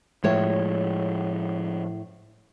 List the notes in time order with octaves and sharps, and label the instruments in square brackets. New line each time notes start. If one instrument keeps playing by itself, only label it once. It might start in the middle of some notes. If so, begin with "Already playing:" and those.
[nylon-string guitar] A2 C#5 E5 [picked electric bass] F3 G#3